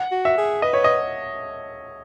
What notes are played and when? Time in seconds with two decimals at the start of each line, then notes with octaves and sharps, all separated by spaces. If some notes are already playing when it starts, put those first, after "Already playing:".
Already playing: F#5
0.11 F#4
0.25 E5
0.37 G#4
0.62 B4 D#5
0.73 C#5
0.84 D#5